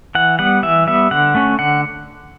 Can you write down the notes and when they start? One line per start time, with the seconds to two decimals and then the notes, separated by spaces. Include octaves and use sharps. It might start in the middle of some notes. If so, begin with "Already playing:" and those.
0.15 E3 F#5
0.39 G3 B3 F#5
0.63 E3 E5
0.87 G3 B3 E5
1.11 D3 F#5
1.34 A3 C#4
1.59 D3 F#5